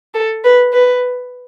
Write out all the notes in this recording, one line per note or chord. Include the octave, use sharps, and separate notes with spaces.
A4
B4
B4